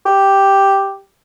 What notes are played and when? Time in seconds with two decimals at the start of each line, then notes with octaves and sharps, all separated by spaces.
0.06 G4